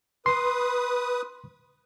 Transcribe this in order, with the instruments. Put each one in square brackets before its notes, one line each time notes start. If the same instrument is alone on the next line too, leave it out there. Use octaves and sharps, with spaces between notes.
[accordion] B4 D#6 [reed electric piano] C6